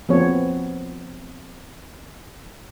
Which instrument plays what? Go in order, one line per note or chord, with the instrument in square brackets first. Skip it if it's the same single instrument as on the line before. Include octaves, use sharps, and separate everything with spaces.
[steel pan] F3 B3 C4 C#5